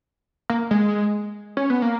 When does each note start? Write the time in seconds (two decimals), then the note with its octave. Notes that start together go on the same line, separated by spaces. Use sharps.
0.50 A#3
0.71 G#3
1.57 C#4
1.70 B3
1.82 A#3